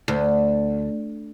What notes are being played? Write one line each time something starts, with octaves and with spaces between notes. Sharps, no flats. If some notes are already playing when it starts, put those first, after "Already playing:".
D2